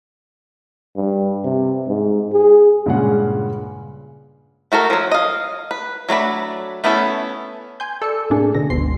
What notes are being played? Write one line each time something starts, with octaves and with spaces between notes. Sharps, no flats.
G2
C3
G#2
G#4
G2 A#2 C#3 G#3 C#4 F#5
A3 F#4 A4 A#4
F3 F#3
D#5 F5
B4
F#3 A3 D4 B5
A3 B3 C#4 E4 A4
G#5 C6 G6
A4 D5 E6 C#7
A2 C3 A3 A#3 D4 G#4
B2 D3 A#6
G1 D2 G#2 B2 C6 C7